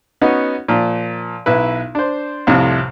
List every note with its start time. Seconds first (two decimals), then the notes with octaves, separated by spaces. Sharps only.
0.21 B3 C#4 D#4 F#4
0.68 A#2 F3
1.46 B1 E4 B4
1.95 D4 C5
2.47 C2 F2 A2 C3